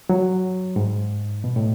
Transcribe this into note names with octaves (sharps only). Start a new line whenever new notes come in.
F#3
G#2
B2
A2